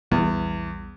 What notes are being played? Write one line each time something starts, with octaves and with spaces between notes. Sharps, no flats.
A#1 E2 G3 B3